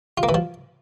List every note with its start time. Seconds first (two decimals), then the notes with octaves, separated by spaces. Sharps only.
0.17 F4
0.23 A#3
0.29 E3
0.34 F3